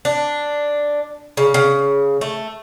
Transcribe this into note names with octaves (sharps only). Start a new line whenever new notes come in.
D4
C#3
C#3
A3